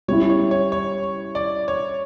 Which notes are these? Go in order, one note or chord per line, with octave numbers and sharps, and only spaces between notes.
G3 C#4 E4 C#5
C#5
C#5
C#5
D5
C#5